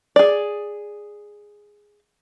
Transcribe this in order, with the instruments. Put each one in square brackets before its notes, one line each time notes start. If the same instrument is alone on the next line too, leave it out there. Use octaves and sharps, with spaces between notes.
[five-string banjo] G#4 D5